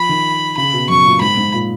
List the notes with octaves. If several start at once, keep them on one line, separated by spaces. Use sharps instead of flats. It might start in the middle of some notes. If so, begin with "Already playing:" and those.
Already playing: F3 B5
D#3
C#3 B5
B2
F#2 C#6
A#2
G#2 B5
G#2
A#2